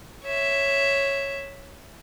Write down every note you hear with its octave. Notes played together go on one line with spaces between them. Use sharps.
C#5 E5